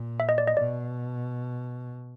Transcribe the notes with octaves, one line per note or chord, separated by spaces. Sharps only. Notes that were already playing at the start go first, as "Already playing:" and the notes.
Already playing: A#2
E5
D#5
D5
D#5
B2 D5